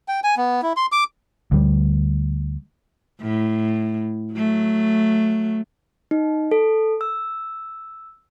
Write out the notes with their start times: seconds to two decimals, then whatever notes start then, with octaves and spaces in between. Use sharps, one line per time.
0.08 G5
0.24 G#5
0.37 B3
0.62 E4
0.77 C6
0.92 D6
1.52 D2 G3
3.21 A2
4.34 F#3 A3
6.11 D#4
6.51 A4
7.01 E6